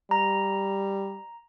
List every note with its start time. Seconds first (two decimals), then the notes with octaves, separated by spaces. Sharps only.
0.11 G3 A#5